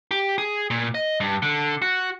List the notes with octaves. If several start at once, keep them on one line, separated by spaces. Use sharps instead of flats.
G4
G#4
A#2
D#5
G2
D3
F#4